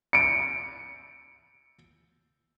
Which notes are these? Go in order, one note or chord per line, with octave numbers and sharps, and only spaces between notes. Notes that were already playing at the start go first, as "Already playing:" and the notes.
C#7 D7